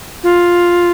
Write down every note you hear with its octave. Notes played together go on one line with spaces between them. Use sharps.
F4